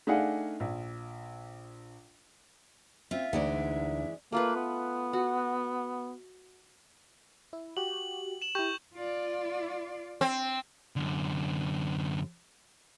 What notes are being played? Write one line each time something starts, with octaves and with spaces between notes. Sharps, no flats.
A3 D4 D#4 G#4 F5 F#5
A#1
C4 F4 E5
D2 E3 G#3 D#4 D5 F#5
A3 A#3 F4 B4
B3
F#4
E4
F#4 G4 F#7
E7 F#7
E4 G4 C#6 G6
F4 D5
C4
F#2 D3